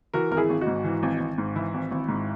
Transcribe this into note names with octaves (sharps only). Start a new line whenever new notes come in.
E3 F#4 A#4
G#1 A#4
E4 G#4
G#1
D#4 F#4
G#2
E3
G#1
G#1
G#2
E3 E4
G#1
G#1
G#2